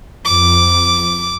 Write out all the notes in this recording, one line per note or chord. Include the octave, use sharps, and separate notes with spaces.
F2 D6